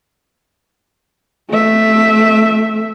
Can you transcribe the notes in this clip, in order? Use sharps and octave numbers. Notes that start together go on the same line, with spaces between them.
A3 E5